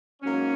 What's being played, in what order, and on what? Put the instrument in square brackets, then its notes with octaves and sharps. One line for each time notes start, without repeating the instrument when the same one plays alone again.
[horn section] G#2 F#3 A#3 C#4